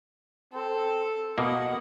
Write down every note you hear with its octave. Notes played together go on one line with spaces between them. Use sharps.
C4 A4
B2 A#3 D#5 F#5